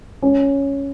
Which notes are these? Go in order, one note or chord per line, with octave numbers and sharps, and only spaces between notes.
C#4